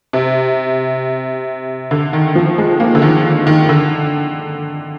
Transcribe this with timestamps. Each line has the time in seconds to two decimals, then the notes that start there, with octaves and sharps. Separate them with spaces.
0.13 C3
1.91 D3
2.13 D#3
2.35 F3
2.58 G#3
2.80 A#3
2.95 D3
3.02 D#3
3.47 D#3
3.69 D3